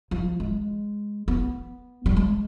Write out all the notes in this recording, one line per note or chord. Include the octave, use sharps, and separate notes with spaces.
F3
G#3
B3
G3
G#3